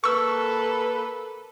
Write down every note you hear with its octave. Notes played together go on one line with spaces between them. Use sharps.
A#3 A4 B4 C#6 E6